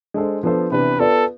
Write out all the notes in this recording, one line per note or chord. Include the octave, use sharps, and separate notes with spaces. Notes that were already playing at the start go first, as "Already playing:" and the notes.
G#3 D4 A4 C5
F3 B3 D4 A4 C5
C3 E3 B3 D4 B4
B3 F4 A4 B4 D5